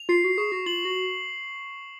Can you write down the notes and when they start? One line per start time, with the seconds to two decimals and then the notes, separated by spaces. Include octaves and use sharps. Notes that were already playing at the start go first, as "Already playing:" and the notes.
Already playing: F7
0.09 F4 C7
0.24 F#4
0.38 G#4 C#6
0.52 F#4
0.66 F4 F#7
0.85 F#4